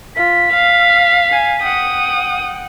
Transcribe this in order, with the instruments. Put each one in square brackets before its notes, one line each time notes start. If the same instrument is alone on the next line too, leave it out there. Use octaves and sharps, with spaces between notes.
[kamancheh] F4 [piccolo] B6
[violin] F5 [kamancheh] F6
[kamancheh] G#5
[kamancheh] F#5 G5 [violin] D#6